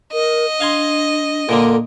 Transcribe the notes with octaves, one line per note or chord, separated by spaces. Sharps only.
A#4 D#5
D4 F5 G#5 C6
A#2 D3 A#3 A4